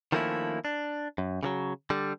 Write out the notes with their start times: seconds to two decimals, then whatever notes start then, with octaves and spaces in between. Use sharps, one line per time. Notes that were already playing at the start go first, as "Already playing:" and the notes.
0.12 D#3 F3 A3 A#3 C#4 E4
0.65 D4
1.18 F#2
1.43 C#3 E3 F#3
1.90 D3 G3